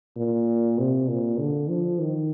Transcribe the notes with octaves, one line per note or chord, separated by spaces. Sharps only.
A#2
C3
A#2
D3
F3
D#3